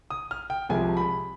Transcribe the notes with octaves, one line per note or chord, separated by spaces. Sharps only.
D#6
F6
G5
C2 C3 F3 G#3 G#5
B5